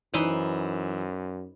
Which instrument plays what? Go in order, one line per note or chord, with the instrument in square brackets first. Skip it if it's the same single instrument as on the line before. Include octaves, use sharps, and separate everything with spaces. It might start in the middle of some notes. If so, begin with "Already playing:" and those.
[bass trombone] F#2 [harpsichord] E3 [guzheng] D#4 B4 C5